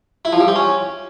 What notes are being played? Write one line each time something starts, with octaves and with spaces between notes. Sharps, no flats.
E4
F3
G3
C4
C#4